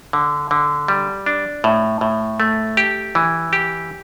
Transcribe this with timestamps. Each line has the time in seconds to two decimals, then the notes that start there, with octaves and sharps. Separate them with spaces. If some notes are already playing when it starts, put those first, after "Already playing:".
0.13 D3
0.51 D3
0.88 G3
1.26 D4
1.64 A2
2.01 A2
2.40 A3
2.77 G4
3.15 E3
3.53 G4